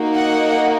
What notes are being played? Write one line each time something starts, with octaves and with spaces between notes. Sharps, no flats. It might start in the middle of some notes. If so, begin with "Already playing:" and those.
Already playing: A#3 D#4 F#4
F#5